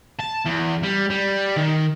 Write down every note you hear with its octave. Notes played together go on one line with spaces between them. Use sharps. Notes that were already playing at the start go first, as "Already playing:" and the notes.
A5
E2
G3
G3
D#3